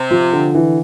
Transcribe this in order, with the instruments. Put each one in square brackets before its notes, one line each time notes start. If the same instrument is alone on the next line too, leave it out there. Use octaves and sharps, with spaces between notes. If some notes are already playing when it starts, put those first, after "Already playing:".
Already playing: [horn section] C3
[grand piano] F3
D3
E3